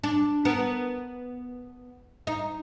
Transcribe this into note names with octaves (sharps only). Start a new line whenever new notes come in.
D4
B3 A#4
D#4